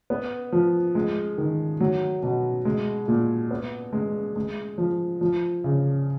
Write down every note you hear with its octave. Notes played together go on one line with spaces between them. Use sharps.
B3
F3
G#3
D#3
F#3
B2
G#3
A#2
B3
G#3
G#3
F3
F3
C#3